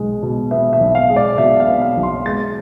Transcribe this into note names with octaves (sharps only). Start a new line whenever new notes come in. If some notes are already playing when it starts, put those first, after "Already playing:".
Already playing: B1 B2 G#3
B2
B3 E5
E5
B1
F5
G#3
D5
B2 E5
F5
B3
F5
B1
C6
G#3 A6